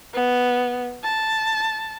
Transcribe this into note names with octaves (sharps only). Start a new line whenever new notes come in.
B3
A5